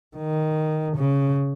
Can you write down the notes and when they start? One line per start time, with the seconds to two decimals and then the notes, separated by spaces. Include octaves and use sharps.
0.16 D#3
0.97 C#3